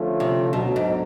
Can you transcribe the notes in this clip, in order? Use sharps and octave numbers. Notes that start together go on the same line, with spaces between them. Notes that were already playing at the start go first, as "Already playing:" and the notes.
Already playing: D3 F3 A3 C#4 F4
C3
D2 B2 D3 F#3
G#2